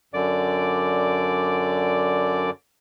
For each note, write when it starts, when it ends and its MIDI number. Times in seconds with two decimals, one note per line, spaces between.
0.14 2.50 42
0.14 2.50 50
0.14 2.50 74
0.14 2.50 86